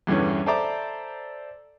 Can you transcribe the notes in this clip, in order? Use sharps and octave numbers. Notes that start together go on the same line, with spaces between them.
E2 G2 D3 E3 C#4
A4 C5 D5 E5 A#5 D6